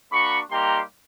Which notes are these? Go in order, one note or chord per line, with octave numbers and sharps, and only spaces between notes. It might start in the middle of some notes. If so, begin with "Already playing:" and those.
A#3 D4 F#4 B5 C#6
G3 A#3 D#4 G4 A#5 C6